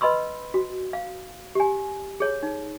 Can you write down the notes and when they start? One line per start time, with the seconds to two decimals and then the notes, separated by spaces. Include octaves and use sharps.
0.01 B4 D#5 B5 C6 E6
0.54 F#4
0.93 F5
1.55 G4 G#5
2.20 G#4 C#5
2.43 D#4